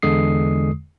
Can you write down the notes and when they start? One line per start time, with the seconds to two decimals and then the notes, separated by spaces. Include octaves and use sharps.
0.02 E2 D3 G#3 D#6 C7